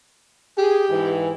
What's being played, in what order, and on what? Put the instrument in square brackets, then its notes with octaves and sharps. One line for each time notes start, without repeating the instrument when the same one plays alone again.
[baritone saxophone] G4 [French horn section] G#4
[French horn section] G#2 E3